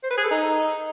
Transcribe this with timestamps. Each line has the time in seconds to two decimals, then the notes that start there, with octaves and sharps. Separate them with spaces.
0.04 C5
0.11 B4
0.17 G#4
0.24 A4
0.31 D#4